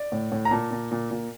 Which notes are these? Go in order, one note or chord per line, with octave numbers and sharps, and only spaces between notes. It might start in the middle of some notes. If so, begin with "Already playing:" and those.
Already playing: D5
A2
A2
A#5
A#2 A5
A#2
A#2
A#2